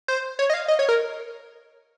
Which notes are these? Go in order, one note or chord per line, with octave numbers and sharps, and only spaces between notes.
C5
C#5
D#5
F5
D#5
C#5
A#4